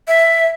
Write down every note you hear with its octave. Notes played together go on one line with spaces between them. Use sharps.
E5